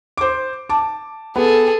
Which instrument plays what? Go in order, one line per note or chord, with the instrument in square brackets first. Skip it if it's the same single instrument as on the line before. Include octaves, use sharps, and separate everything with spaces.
[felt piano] C5 D6
A5 D6
[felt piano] B3 [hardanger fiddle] G#4 A4